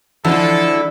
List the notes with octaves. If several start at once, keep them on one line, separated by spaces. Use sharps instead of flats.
D3 F3 G#3 E4 A4